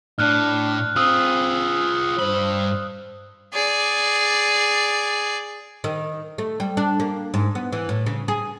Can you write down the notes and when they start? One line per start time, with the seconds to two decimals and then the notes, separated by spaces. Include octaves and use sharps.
0.19 A2 D4 F6 F#6
0.96 C4 F4 G#4 D#6 E6
2.19 G2 C5 B5
3.53 G#4 D5
5.84 D#3
6.38 A3
6.60 G3
6.77 D4
7.00 A#3
7.34 G#2
7.55 B3
7.73 E3
7.89 A2
8.06 C#3
8.28 G#4